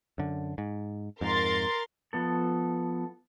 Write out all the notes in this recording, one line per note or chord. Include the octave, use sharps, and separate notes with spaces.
F#2 D3
G#2
F2 G#2 A#4 C6 A6
F3 B3 A4